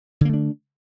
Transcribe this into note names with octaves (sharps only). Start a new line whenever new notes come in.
D3 A3 A#3 D4